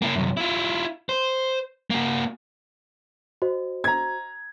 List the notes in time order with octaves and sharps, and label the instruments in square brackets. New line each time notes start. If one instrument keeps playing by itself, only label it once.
[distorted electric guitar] A#3 E4
C2 F#2
E4 F4
C5
A#3 F#4
[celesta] F#4 C5 D#5
[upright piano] A#5 G#6